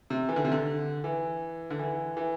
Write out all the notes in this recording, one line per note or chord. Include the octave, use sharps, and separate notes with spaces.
C3
E3
D3
C3
D3
E3
D3
E3
E3